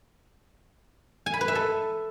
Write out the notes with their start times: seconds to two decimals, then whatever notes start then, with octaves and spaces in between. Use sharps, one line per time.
1.26 G#5
1.34 B5
1.41 B4
1.48 E5
1.55 A4